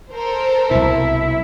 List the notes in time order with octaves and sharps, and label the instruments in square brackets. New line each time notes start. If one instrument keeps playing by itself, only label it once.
[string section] A4 A#4 C5
[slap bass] C2 B2 [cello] E4